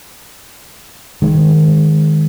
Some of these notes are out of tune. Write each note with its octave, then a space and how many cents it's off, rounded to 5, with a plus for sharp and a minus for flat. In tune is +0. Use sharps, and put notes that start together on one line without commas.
D#3 +0 G#3 +0